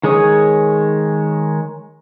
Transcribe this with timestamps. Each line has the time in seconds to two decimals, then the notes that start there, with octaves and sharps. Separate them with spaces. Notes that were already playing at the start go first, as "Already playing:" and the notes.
0.04 D#3 G#3 G#4 C#5 D#6